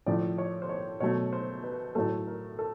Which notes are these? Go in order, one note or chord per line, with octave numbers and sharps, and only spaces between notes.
A2 F3 A3 D5
C#5
C5
C#5
B2 F#3 A3 C#5
C5
B4
A2 F#3 A3 A4
A#4
A4